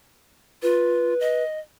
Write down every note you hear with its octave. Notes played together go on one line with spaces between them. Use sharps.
F4 B4
D#5